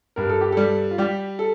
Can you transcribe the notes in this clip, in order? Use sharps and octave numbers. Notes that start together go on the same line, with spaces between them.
G2 A#4
A4
G4
G3 A4
F4
G3 G4
A4